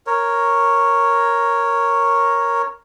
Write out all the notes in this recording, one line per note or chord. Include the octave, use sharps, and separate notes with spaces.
A#4 C#5